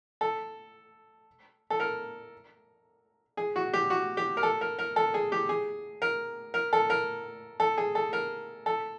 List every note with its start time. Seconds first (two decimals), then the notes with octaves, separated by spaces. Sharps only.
0.21 A4
1.70 A4
1.80 A#4
3.37 G#4
3.56 F#4
3.73 G4
3.90 F#4
4.17 G4
4.37 A#4
4.43 A4
4.61 A#4
4.79 A#4
4.96 A4
5.14 G#4
5.32 G4
5.49 G#4
6.02 A#4
6.54 A#4
6.73 A4
6.90 A#4
7.60 A4
7.78 G#4
7.95 A4
8.13 A#4
8.66 A4